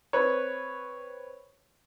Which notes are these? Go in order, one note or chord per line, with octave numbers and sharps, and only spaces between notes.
C4 B4 C#5